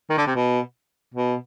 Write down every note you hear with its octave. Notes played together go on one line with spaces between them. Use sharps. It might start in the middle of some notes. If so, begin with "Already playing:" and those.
D#3
D3
C3
B2
B2